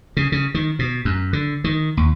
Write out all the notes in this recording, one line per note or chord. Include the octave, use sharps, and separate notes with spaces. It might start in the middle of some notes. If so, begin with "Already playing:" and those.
C#3
C#3
D#3
B2
F#2
D3
D#3
D#2